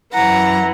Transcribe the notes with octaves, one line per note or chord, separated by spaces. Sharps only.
F#2 E3 F#5 A#5